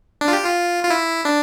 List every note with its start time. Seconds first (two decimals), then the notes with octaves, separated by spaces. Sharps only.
0.21 D4
0.28 F4
0.33 G4
0.44 F4
0.84 F4
0.90 E4
1.25 D4